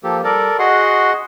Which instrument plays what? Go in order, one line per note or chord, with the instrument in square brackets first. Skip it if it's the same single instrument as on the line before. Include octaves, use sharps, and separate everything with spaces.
[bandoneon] F3 A#3 G4 [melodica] A4
[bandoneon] G3 [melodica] A4 A#4 D5
[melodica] F#4 C6 [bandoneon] G#4 D#5 F#5